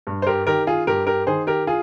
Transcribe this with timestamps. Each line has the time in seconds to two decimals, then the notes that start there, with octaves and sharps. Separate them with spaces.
0.07 G2
0.22 C5
0.26 G4 A#4
0.46 D#3 G4 A#4
0.67 F4 G#4
0.87 G2 G4 A#4
1.07 G4 A#4
1.27 D#3 G#4 C5
1.47 G4 A#4
1.67 F4 G#4